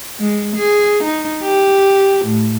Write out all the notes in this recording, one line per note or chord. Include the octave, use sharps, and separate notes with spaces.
G#3
G#4
D#4
G4
A2